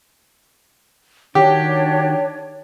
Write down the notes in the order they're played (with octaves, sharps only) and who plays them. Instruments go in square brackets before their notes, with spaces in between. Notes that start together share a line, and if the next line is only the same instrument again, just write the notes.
[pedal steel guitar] D#3 F#4 G5 [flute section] D4 C#5 [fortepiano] G4